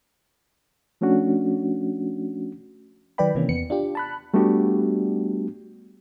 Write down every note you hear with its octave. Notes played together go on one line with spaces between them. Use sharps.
F3 A3 C#4 D4 F#4
D#3 F#3 B4 D5 G5 B5
C3 D#3 E3 A#3 C#4
E2 B3 C#7
D4 F4 G4
A5 B5 F#6
G3 A3 B3 D4 F#4 G4